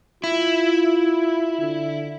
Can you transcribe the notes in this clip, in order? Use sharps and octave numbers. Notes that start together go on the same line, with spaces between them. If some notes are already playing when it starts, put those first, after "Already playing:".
E4 F4
D3